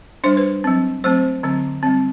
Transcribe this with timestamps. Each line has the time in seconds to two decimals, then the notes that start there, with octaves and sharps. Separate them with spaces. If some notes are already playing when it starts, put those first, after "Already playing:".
0.24 G3 D4 C5
0.37 B4
0.64 F#3 C4
1.04 F#3 A3 C4 C5
1.43 D3 F#3 C4
1.83 G3 C4